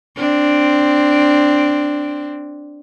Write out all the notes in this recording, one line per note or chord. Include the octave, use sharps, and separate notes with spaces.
C4 D4